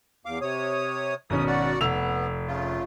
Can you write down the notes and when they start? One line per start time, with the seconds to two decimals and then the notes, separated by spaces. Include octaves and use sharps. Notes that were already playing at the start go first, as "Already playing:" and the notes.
0.26 E2 F5 D6
0.41 C3 C#5 D#6
1.30 G#1 B2 C#4 D#6
1.47 F#4 D5 F#5
1.81 F1 B3 E6 F7
2.47 C#3 A3 F4